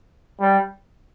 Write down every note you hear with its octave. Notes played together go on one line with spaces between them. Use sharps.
G3